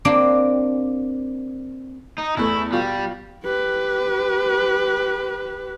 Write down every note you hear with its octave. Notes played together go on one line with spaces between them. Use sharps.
A#3 C4 D4 G4
D#4
E2 A3 E4
B2 G3 F4
G4 B4